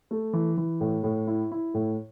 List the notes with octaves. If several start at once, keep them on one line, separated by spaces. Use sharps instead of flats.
A3
E3
E3
A2
A2
E4
E4
A2